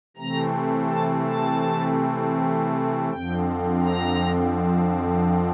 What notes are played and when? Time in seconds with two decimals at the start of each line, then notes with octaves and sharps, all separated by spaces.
0.17 C3 E3 A3 C4 A#5
0.90 A5
1.27 A5
3.10 F2 D3 F3 C4 G5
3.82 A#5